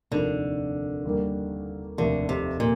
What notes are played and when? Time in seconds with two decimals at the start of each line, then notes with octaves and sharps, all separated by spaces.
0.11 F1 D#2 D3 D#3 A#3 F4
1.05 D#2 D#3 G3 A#3
1.98 F1 D#2 D3 D#3 A3
2.29 C3
2.60 A#2